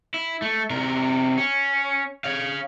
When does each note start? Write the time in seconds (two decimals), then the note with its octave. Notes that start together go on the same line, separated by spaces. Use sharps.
0.14 E4
0.42 A3
0.70 C3 A#4
1.38 C#4
2.24 C#5 F5